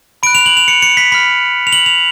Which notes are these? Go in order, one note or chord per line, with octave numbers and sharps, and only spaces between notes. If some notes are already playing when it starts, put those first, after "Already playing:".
B5 F#6 D7
F7
F#7
F7
C#7
C#7
B6
B5 F6 B6
F7
F#7
F7